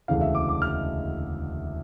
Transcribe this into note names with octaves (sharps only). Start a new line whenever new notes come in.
E1 D2 C#3 E3 F5
E5
D6
D6
F6